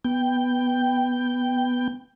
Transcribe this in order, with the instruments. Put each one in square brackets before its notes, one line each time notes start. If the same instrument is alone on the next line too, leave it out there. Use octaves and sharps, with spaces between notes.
[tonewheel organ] B3 G5